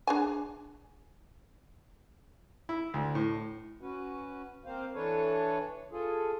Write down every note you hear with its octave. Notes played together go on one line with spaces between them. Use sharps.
D4 G#4 G#5
E4
D2
A2
C#4 F#4 B4
A#3 C4 C5 F5
E3 D4 A4 B4 C#5
F4 G#4 A4